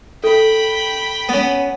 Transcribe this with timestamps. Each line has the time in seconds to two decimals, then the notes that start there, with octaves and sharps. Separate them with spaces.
0.24 A4 G5 B5
1.29 B3 C#4